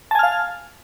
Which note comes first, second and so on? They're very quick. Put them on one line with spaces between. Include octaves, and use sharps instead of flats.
A5 G#5 F6 F5